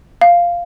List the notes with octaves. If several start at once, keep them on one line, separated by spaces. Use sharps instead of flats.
F5